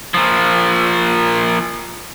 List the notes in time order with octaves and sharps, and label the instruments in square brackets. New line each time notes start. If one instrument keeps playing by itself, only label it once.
[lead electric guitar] A#2 F3